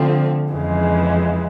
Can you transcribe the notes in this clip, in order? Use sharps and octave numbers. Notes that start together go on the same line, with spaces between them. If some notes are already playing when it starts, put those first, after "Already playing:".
Already playing: D3 F3 A3 C4
F2 C#3 E3 G#3